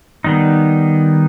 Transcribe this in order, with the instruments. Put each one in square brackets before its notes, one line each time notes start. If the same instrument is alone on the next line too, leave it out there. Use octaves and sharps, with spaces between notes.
[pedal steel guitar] D#3 G3 B3 D#4